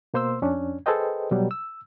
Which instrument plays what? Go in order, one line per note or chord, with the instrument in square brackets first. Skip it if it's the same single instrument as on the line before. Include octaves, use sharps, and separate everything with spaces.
[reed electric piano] B2 A#3 C5 C6 E6
F2 C#4 D4
G#4 A4 B4 C5 D#5 G5
B2 F#3 G3
E6